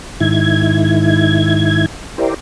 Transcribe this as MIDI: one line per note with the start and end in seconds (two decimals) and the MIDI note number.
0.20 1.86 44
0.20 1.86 51
0.20 1.86 64
0.20 1.86 92
2.18 2.34 64
2.18 2.34 67
2.18 2.34 70
2.18 2.34 72
2.18 2.34 74